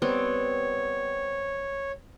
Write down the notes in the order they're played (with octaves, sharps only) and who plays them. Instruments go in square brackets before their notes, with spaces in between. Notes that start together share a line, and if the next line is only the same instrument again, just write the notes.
[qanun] G3 B3 C4 [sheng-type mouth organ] C#5